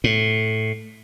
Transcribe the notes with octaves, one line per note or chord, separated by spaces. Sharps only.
A2